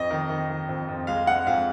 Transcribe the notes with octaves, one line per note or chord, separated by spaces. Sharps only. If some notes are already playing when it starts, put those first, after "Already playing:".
Already playing: F2 D#5
D#3
D#3
D#3
F2
F2
G#3 F5
G#3 F#5
F2 F5